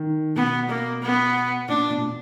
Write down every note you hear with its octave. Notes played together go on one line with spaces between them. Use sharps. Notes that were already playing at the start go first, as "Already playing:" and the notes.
Already playing: D#3
B2 B3
A#3
B3
A#2 D4
B2
A#2
B2